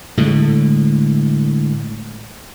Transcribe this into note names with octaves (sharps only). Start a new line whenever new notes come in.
A2 D3 G#3